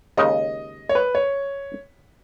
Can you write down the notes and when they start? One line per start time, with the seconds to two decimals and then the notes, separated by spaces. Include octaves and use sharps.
0.17 D#2 C#3 G#3 D#4 D#5
0.89 C#5
0.95 B4
1.15 C#5